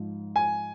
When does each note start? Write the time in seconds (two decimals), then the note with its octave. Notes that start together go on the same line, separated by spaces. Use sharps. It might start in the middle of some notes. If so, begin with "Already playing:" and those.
Already playing: G#2 F3
0.36 G#5